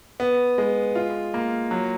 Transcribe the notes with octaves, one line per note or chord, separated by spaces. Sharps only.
B3
G#3
F4
A#3
F#3